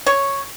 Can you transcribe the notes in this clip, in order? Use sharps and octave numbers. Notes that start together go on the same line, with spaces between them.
C#5